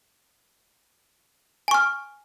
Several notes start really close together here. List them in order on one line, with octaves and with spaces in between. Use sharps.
G#5 C#6 F6